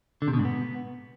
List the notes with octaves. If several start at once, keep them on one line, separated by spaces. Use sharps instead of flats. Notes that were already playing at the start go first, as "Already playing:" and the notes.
D3
C3
B2
G#2
B3